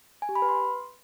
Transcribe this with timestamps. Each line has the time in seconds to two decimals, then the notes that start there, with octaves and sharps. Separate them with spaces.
0.22 G#5
0.29 G4
0.35 B5
0.42 B4
0.49 C6